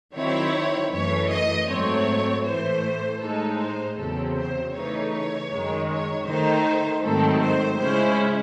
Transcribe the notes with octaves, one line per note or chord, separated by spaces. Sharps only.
D#3 F#3 C4 E4 C#5
F#2 E3 A3 C#5
D#5
G#2 F#3 A3 C4 C#5
A2 E3 A3 C5
A2 G#3 D#4 A4
C5
E2 C#3 F#3 C4 A4
C5
C#3 E3 A3 D#4 C#5
C#5
F#2 D#3 G#3
C#5
D#3 A3 D#4 C5
G#2 D#3 F#3 A3 C4 A4
C5
C#3 G#3 C#4 E4 C5